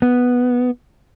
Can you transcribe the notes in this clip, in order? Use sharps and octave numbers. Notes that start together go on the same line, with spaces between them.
B3